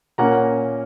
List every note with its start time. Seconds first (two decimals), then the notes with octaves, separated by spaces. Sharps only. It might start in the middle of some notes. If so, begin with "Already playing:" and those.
0.18 A#2 A#3 C#4 F#5 A#5